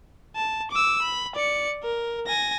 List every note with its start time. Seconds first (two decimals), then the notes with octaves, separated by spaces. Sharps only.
0.36 A5
0.71 D6 E6
1.02 B5
1.35 D5 C#7
1.83 A#4
2.27 G#5 A#6